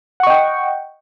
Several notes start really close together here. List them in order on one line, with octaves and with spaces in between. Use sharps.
F#5 C#6 D#5 G5